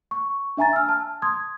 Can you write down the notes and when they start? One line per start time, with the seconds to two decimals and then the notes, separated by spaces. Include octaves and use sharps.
0.11 C#6
0.57 D4 E5 G#5 A#5 A6
0.73 E6 F6
0.89 A5
1.22 C6 D#6 G#6